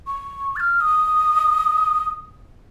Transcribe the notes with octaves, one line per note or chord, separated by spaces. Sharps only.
C#6
A6
F6
D#6